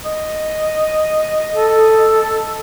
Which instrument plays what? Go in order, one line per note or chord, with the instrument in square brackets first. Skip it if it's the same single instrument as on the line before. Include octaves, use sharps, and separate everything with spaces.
[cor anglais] D#5
[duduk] A4